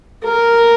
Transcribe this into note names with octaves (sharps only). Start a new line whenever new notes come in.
A#4